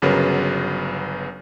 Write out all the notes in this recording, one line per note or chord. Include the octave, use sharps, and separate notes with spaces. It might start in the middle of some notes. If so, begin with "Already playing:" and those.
G1 C#3 F#3 A#4 B4